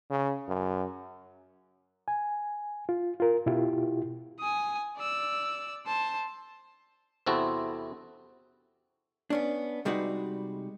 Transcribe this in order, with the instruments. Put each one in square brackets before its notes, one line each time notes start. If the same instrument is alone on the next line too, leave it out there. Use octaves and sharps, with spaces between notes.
[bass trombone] C#3
F#2
[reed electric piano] G#5
F4
F4 A#4
B2 E4 F4 G4
[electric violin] G#5 D#6
D5 E6
C5 A5
[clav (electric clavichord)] E2 C3 C4 E4 F#4 A4
[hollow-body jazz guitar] B3 C#4 D4
C3 G3 G#3 D#4 F#4 B4